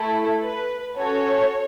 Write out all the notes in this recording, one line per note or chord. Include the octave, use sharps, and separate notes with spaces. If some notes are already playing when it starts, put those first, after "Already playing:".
Already playing: A3 E4 A4
B4
C#4 F#4 A4 C#5